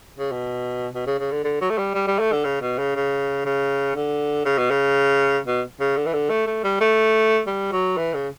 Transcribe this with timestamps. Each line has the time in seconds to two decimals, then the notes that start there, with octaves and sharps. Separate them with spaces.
0.19 C#3
0.32 B2
0.95 B2
1.07 C#3
1.19 C#3
1.32 D3
1.44 D3
1.61 F#3
1.70 A3
1.78 G3
1.95 G3
2.07 G3
2.19 A3
2.32 D3
2.45 C#3
2.61 B2
2.79 C#3
2.96 C#3
3.45 C#3
3.95 D3
4.45 C#3
4.59 B2
4.71 C#3
5.47 B2
5.80 C#3
5.97 D3
6.06 E3
6.13 D3
6.30 A3
6.47 A3
6.64 G3
6.81 A3
7.47 G3
7.72 F#3
7.97 E3
8.14 C#3